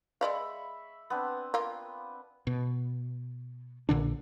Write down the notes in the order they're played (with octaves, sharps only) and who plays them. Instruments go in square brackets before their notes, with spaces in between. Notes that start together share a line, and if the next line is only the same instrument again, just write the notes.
[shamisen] G#3 D5 F5 [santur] E5 B5 C#6
[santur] B3 C4 D4
[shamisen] A#3 F4
[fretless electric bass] B2
A#1 A#2 D3 D4